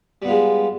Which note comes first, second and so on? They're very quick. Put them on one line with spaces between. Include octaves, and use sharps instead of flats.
G3 B3 F4 G#3